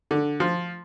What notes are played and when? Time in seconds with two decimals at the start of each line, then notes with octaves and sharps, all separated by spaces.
0.11 D3
0.40 F3